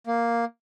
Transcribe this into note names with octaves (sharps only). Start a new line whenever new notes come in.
A#3